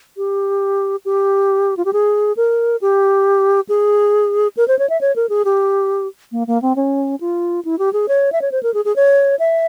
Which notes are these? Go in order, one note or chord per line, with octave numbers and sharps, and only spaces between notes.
G4
G4
F4
G4
G#4
A#4
G4
G#4
A#4
C5
C#5
E5
C#5
A#4
G#4
G4
A#3
A#3
C4
C#4
F4
E4
G4
G#4
C#5
E5
C#5
C5
A#4
G#4
G#4
C#5
E5